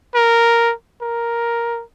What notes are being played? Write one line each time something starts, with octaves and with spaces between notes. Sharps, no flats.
A#4
A#4